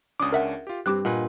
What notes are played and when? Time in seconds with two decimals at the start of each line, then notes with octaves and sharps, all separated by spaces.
0.20 C#2 C#4 D4 D6 D#6
0.32 A#4 E5 F#5
0.67 F4 G4
0.86 G2 C4 G4 D6 F#6
1.05 A#2 B4 D#5 F#5 G#5